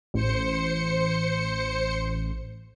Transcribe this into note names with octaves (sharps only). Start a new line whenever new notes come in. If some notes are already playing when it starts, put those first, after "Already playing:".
A1 C5 C#7